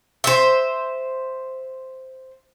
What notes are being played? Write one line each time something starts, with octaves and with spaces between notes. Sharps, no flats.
C5 E5